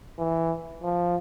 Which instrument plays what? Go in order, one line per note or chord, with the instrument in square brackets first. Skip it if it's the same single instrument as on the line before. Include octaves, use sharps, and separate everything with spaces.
[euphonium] E3
F3